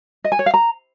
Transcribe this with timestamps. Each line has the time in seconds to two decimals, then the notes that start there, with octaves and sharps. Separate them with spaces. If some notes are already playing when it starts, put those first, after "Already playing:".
0.24 D#5
0.32 G#5
0.39 C#5
0.46 F5
0.54 A#5